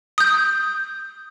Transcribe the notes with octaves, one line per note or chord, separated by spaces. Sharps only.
D#6 G6